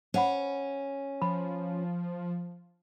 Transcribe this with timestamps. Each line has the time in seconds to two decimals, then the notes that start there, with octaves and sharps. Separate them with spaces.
0.14 C#4 C5 F#5 B5
1.22 F3 B5